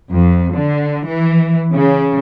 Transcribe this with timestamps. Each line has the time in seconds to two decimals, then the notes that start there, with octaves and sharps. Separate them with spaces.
0.12 F2
0.55 D3
1.07 E3
1.73 C#3